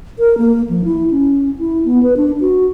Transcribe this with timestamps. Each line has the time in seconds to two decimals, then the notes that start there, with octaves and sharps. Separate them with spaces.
0.19 A#4
0.38 A#3
0.70 F3
0.85 E4
1.11 C#4
1.59 E4
1.85 B3
2.03 B4
2.17 D4
2.41 F#4